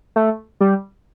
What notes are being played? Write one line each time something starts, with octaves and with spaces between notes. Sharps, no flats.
A3
G3